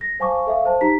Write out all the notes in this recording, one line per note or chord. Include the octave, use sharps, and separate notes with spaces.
A#6
C5 F5 G#5 A5 C#6 D6
A4 E5 F5
C5 A5
D#4 G4 A#5 B6